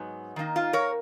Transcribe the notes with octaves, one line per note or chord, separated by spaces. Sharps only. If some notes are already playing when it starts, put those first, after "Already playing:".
Already playing: G#2 F#3 B3 D#4
D#3 A#3 D#4
F4
A#4 C#5